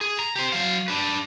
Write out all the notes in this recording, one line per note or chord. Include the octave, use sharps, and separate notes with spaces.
G#4
A#5
G4 C5
F#3 F5
D4 B4